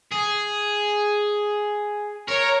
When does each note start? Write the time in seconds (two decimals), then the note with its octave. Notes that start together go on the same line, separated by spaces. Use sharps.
0.12 G#4
2.28 A#4 C#5